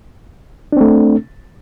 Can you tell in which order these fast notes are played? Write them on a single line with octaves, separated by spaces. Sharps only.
D4 C4 A3